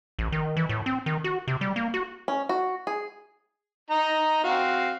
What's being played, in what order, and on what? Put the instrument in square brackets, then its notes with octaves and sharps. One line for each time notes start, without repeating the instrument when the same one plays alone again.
[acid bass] A1
D#3
E3
A2
C4
D#3
F#4
C3
G3
A#3
F#4
[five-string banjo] C#4
F#4
G#4
[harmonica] D#4 A#5
C4 F#4 F5